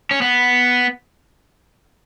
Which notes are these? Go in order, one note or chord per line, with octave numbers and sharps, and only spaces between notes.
C#4
B3